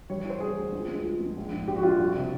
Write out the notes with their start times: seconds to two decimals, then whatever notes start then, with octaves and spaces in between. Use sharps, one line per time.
0.10 G3 C#5
0.20 C#5
0.25 E3 C5
0.40 G3 G#4
0.57 D2
0.73 C#2
0.88 G#3
1.05 F3
1.20 G#3
1.37 A#1
1.53 G#2
1.68 A#1 G4
1.76 F#4
1.83 A#1 F4
2.00 C2
2.16 C3